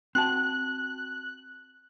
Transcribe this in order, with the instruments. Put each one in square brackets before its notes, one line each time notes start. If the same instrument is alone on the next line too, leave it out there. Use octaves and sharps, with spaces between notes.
[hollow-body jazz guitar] C4 F#4 A5 [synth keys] F#6